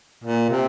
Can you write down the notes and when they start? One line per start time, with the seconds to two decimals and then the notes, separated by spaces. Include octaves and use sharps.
0.24 A#2
0.50 C3